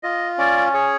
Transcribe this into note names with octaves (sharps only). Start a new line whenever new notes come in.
F4 D#5
C#4 D5
G#4 C#5